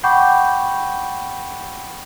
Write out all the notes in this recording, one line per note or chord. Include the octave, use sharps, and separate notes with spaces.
F#5 G5 B5 C#6 D6 G6